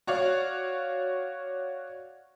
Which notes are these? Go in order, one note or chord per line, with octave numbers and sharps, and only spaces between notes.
F#4 C#5 D5 F5